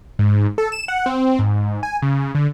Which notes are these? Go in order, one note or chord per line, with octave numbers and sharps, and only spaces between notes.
G#2
A4
E7
F#5
C4
G#2
G#5
C#3
D3